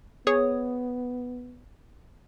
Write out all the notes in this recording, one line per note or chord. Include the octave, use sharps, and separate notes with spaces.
B3 G#4 C#5 D#6